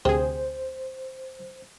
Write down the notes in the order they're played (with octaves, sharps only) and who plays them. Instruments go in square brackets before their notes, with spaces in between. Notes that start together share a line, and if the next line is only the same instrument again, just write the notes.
[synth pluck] D2 G#4 [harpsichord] C3 [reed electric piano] C5